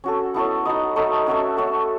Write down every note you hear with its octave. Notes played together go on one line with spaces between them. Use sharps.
C#4 F#4 A4
B3 E4 A4 C#5
D#4 F#4 B4 D#5
A3 D#4 A4 C#5
C#4 F#4 A4 E5
A3 C#4 F#4 A4